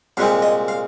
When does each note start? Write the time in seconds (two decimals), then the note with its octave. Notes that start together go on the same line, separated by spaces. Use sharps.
0.17 C2 A#2 G#3 C4 F5
0.42 D#5
0.68 F5